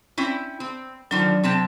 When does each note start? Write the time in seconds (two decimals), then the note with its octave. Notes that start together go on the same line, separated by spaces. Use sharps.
0.18 C4 C#4 E4
0.60 C4
1.11 D3 D#3 F3 F#3
1.43 C3 C4 A5